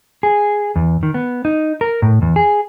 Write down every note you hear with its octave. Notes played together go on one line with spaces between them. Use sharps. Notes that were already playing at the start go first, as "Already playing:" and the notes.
G#4
E2
D#3
B3
D#4
A#4
A2
E2
G#4